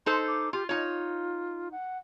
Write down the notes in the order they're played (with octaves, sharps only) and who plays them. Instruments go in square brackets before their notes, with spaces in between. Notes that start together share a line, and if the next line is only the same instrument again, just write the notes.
[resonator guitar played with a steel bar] D#4 A4 C5 [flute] C6
[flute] D6
[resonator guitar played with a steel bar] F4 [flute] G4
[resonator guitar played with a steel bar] D#4 C#5 [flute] F4
[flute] F#5